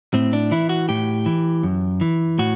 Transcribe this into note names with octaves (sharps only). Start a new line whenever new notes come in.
A2 C4
D4
E3 E4
F#4
A2 G4
E3
F#2
E3
A2 F#4